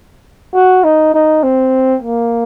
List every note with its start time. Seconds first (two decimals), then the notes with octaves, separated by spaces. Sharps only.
0.54 F#4
0.84 D#4
1.14 D#4
1.43 C4
2.02 A#3